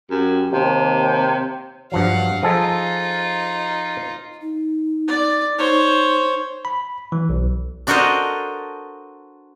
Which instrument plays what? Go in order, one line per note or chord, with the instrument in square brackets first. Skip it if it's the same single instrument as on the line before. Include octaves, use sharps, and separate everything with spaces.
[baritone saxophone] F#2 [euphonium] G4
[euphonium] D#2 [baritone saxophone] C3
[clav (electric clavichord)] G2 F3 F#3 [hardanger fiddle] F5 F#5
[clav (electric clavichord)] F3 G#4 A4 [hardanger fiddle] D#4 F4
[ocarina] D#4
[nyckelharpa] D5
[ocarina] D#4 [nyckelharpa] C5 C#5
[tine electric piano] B5
E3
B1
[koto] D4 F#4 A4 A#4 C5 D#5